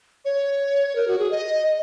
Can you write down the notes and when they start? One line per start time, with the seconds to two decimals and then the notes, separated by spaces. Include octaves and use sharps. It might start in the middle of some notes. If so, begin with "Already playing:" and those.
0.25 C#5
0.96 A#4
1.08 F#4
1.19 G#4
1.31 D#5
1.66 D#5